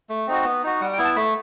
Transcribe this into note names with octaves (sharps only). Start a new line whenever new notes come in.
A3
C4 D#4 F#4
B3
D#4 F#4
G3 F#5
G5
B3 E4
A5
A3 B5